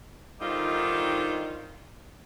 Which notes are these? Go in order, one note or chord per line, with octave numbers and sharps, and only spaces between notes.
D3 D#3 G3 C4 D#4 F4